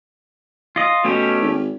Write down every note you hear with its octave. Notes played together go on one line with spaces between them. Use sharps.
F4 D#5
B2 A3 C#4 G4
G#1